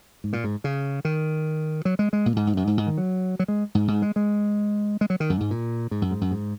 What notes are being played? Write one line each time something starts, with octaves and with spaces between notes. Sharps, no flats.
G#2
A#2
G#2
C#3
D#3
F#3
G#3
G#3
A#2
G#2
G#2
F#2
G#2
G#2
D#3
F#3
F#3
G#3
G#2
G#2
G#3
G#3
G#3
F#3
D#3
F#2
G#2
A#2
G#2
F#2
G#2
F#2
G#2